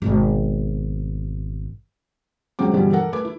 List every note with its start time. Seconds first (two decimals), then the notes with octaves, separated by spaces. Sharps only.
0.02 G#1 B2
2.59 E1 C#2 C#3 F#3 C4 D6
2.73 G2 B2 D3 E3 F3 G3
2.93 A4 A#4 F#5
3.13 A3 B4 D6
3.25 E4